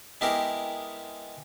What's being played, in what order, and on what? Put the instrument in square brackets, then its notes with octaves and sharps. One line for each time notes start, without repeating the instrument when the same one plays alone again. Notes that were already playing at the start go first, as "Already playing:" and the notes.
[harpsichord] G#3 B3 E4 G4 G#4 A#4